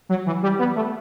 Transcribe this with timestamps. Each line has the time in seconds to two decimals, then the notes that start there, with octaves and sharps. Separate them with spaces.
0.09 F#3
0.26 E3
0.42 G3
0.59 B3
0.75 A3